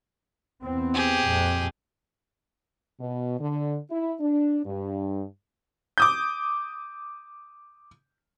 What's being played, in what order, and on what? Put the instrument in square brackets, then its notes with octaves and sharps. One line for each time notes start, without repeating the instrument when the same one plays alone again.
[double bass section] E2 B3 C4
[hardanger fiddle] G4 G#4
[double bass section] F2 A#2
[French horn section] B2
D3
E4
D4
G2
[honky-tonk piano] D6 D#6 G6